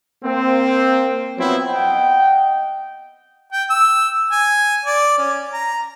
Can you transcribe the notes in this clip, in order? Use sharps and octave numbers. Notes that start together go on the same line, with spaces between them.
A#3 C4
F3 F#3 B3 C4 E4
D#5 F#5 G5
G5
E6
G#5
D5
C#4
A#5